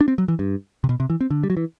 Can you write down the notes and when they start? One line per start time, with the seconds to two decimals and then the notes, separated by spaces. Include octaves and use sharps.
0.01 D4
0.08 C4
0.18 F#3
0.28 E3
0.39 G2
0.84 C3
0.89 B2
1.00 C3
1.10 E3
1.21 C4
1.30 D3
1.43 G3
1.50 F#3
1.57 E3